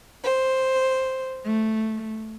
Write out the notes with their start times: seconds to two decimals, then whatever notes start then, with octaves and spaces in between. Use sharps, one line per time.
0.25 C5
1.45 A3